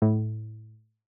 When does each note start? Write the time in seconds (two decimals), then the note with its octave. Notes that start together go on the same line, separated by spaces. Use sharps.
0.02 A2